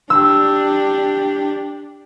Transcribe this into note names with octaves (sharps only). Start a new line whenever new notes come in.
D4 G4 E6